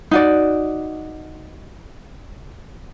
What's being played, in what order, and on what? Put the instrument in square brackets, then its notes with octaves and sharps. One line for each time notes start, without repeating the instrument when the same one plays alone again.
[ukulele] D#4 F#4 D5